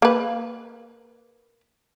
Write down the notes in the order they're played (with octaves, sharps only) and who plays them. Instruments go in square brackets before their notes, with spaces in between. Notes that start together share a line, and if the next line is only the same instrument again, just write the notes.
[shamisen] A#3 B4